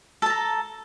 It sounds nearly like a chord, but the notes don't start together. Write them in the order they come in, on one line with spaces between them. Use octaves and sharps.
A4 A5 A#5